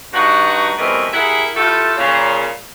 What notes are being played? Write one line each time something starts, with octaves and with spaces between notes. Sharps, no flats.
G2 D#4 F#4
B2 E3 G3 A3 A#3 C4
E4 G4 G#4 A#4 E5 F#5
A3 E4 F4 G4 A4
A#2 C#3